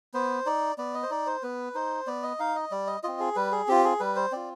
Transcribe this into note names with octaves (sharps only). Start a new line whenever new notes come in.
B3 C5
D#4 D5
B3 D5
D#5
C5
D#4 D5
C5
B3 B4
D#4 C5
B3 D5
D#5
D#4 F5
D#5
G3 D5
D#5
C4 F4 D#5
G#4
G3 B4
G#4
C4 F4 G4
G#4
G3 B4
C5
C4 F4 D5